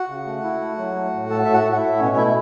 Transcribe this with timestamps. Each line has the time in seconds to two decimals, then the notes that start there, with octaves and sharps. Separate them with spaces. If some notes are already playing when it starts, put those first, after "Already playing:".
Already playing: F#4 F#5
0.09 C#3
0.27 A3
0.44 E4
0.61 A3
0.78 F#3
0.96 A3
1.13 A2
1.30 A3 A4 A5
1.45 A2 E5
1.53 F#4 F#5
1.65 A2
1.72 F#5
1.76 E4 E5
1.82 A2
1.99 B2 C#4 C#5
2.16 A3 E4 E5